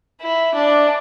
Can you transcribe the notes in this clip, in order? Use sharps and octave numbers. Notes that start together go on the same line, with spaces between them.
E4
D4